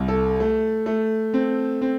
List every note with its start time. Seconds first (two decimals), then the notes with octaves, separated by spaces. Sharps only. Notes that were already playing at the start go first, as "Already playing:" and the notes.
Already playing: C2
0.08 A4
0.40 A3
0.86 A3
1.34 C4
1.81 C4